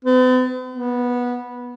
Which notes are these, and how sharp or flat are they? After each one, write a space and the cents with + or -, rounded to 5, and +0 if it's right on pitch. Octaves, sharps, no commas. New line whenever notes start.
B3 +45
B3 -15